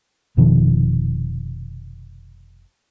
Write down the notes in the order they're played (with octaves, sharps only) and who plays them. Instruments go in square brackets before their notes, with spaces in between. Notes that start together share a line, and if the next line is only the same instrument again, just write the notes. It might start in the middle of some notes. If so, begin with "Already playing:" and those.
[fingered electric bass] F1 B2 D#3 F3